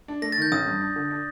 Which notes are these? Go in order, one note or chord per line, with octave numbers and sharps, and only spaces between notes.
D4
A3 A#6
A6
D#3 G6
A1 D#6
G2
D4
D3
D4